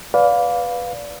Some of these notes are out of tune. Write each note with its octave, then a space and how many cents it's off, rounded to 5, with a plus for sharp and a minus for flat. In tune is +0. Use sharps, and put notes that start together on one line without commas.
B4 +0 D5 -20 F5 +15